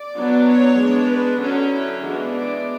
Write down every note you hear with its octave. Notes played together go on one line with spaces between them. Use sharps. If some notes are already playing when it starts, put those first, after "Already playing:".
Already playing: D5
F#3 B3 D4
C#5
G#3 B3 D4
B4
D3 F#3 C#4 A4
E4
E3 G#3 B3 D4 F#4
D5